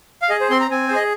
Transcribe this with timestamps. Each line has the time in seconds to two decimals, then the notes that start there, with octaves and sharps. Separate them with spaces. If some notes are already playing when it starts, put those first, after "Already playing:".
0.22 F5
0.30 G#4 D#5
0.41 C5
0.50 C4 C6
0.60 A#5
0.71 C4 G#5
0.88 C5
0.91 G#4 D#5